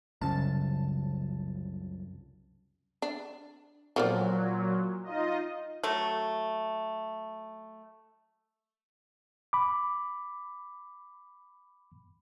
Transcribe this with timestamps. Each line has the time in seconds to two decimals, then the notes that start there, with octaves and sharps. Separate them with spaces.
0.21 C2 F#2 C#3 A5
3.02 D4
3.96 A#2 F3 F#3 A#4 D5
5.04 D#4 F4 D#5
5.83 F#3 A3
9.53 B5 D6